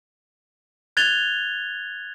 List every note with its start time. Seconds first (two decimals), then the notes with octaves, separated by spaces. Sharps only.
0.97 F#6 G#6 A6 F7 G7